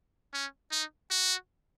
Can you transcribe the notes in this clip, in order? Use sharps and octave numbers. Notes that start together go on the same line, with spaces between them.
C#4
D#4
F#4